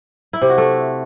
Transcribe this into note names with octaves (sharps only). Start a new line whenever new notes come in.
E4
C3
F#4
A3